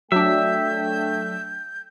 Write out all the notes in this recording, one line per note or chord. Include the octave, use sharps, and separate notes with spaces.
F#3 A3 D4 E5 G5 G6